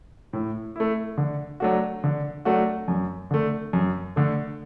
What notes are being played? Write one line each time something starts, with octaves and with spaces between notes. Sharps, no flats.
A2
A3 E4
D3
F#3 A3 D4 F#4
D3
F#3 A3 D4 F#4
F#2
D3 A3
F#2
D3 A3